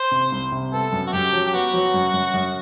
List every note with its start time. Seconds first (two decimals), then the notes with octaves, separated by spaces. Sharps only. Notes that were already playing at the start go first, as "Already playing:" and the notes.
Already playing: C5
0.11 C3
0.32 C2
0.52 C3
0.72 B3 A4
0.92 F#2
1.07 F#4
1.12 F#2 G4
1.33 F#3
1.47 G4
1.53 B3 F#4
1.74 F#3
1.94 F#2
2.14 F#2
2.34 F#2